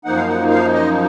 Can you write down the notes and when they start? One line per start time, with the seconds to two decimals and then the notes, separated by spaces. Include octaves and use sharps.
0.05 F#2 F3 A#3 D#4 F#5
0.17 F5
0.28 F#5
0.50 F5
0.74 D#5